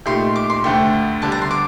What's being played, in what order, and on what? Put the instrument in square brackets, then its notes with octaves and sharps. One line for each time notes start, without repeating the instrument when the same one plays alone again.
[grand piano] A#2 A3 D#4 G4 [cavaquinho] C6
[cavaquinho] D6
C6
[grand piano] D2 D3 A3 [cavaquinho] G5
[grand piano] D3 G3 D4 G4 [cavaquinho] A5
[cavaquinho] A#5
C6
D6